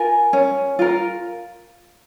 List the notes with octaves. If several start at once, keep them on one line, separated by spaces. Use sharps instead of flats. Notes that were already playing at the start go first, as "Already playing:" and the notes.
Already playing: F4 A#4 G#5
C#4
F4 A#4